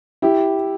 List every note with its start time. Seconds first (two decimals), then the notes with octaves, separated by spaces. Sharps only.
0.22 E4 G4